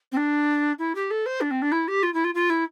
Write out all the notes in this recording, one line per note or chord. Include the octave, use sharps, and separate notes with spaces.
C4
D4
E4
G4
A4
C5
D4
C4
D4
E4
G4
F4
E4
F4
F4
E4